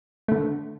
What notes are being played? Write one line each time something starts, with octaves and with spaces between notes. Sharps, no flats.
D3 A3